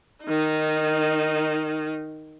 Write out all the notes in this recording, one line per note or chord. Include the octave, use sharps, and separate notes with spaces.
D#3 D#4